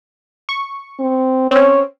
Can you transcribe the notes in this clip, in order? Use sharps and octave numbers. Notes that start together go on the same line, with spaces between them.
C#6
C4
C4 C#4 C#5